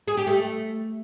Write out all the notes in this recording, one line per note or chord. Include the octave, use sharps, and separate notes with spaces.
G#4
G4
A3